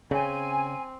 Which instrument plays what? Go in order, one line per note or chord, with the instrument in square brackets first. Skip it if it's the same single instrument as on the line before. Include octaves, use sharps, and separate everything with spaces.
[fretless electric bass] C#3 [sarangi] C4 [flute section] G#5